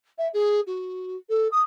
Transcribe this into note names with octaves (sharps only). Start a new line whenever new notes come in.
E5
G#4
F#4
A4
D#6